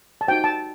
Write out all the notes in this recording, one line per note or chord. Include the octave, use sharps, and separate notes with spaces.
A5
D#4 F#4 C5 G5
A5